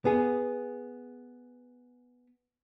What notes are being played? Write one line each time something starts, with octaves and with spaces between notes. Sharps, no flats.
B3 G#4